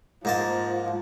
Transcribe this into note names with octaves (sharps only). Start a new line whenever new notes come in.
G#2 F3 A#3 A5